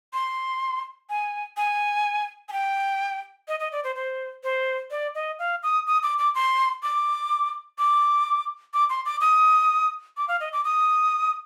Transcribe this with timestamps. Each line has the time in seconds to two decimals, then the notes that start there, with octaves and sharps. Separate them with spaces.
0.13 C6
1.10 G#5
1.57 G#5
2.49 G#5
2.52 G5
3.48 D#5
3.60 D#5
3.72 D5
3.84 C5
3.96 C5
4.43 C5
4.91 D5
5.15 D#5
5.39 F5
5.63 D#6
5.87 D#6
6.03 D6
6.19 D6
6.35 C6
6.83 D6
7.78 D6
8.74 D6
8.90 C6
9.06 D6
9.21 D#6
10.17 D6
10.28 F5
10.40 D#5
10.53 D6
10.65 D#6